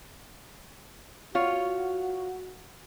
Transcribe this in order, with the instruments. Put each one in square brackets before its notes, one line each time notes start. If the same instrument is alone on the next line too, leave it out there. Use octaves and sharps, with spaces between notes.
[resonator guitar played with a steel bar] F4 C#5 [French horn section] F#4